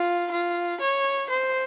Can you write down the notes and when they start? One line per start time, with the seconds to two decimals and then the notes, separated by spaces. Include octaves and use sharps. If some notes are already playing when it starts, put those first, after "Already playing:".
Already playing: F4
0.31 F4
0.80 C#5
1.30 C5